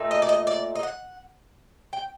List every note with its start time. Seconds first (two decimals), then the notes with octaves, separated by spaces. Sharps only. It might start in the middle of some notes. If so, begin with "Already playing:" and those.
Already playing: A#2 A3 D#4
0.11 D#5
0.22 D5
0.29 D#5
0.47 D5
0.75 D#5
0.83 F#5
1.93 G5